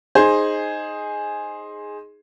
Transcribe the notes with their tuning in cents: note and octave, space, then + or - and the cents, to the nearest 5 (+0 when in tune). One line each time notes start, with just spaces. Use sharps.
D#4 +0 G#4 +0 C5 +10